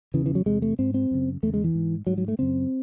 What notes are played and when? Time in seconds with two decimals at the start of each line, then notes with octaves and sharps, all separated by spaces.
0.14 E2 C#3 E3
0.26 E3
0.35 F#3
0.46 E2 C3 G#3
0.62 A3
0.79 G#2 C4
0.94 C4
1.11 F#2 C#3
1.43 E2 A3
1.47 C#3
1.54 G#3
1.64 E3
1.75 G#2
2.07 G#2 F#3
2.18 F#3
2.28 A3
2.39 F#2 C#3 C4